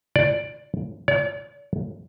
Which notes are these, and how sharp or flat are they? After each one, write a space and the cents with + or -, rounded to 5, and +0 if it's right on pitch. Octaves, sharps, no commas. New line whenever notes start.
D5 +5
D5 -45